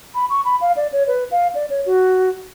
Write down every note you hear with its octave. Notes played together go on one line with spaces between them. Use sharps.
B5
C#6
B5
F5
D5
C#5
B4
F5
D5
C#5
F#4